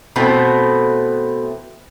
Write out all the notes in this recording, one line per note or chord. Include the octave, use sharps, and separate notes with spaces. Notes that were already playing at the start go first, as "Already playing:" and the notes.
B2 E3 A3 B3 C4